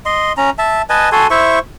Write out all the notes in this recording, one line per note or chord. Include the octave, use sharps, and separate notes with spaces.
D#5 C6
C#4 A#5
E5 A5
B4 D#5 G#5 A5
F#4 A4 G#5 C6
E4 C5 E5 C#6